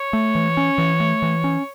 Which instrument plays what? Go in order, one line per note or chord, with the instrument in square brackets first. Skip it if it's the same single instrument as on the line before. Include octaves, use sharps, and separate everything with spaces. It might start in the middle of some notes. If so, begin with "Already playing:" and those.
Already playing: [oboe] C#5
[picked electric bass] A3
E3
C#4
E3
A3
E3
C#4